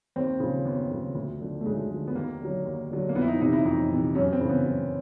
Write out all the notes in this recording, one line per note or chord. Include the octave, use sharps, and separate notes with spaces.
D#2 C4
C#3 F3
D#2 B3
C#3 F3
D2
D3 F3
A3
D2 G#3
D3 F3
B3
D#2 A#3
D3 F#3
D#2
D3 F#3
A#3
F2 B3
E4
D#4
C3 E3 D#4
E4
F2 D#4
C3 E3
F#2 C#4
C4
C#3 E3
B3
F#2